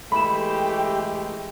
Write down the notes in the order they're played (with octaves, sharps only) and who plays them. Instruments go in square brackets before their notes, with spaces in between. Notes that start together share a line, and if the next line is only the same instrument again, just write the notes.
[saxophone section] E3 G#3 A3 [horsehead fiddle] G4 [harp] B5 E7